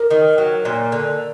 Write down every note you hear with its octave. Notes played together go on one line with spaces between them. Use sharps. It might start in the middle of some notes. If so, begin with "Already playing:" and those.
Already playing: A#4
D#3
F#3
A#2
D3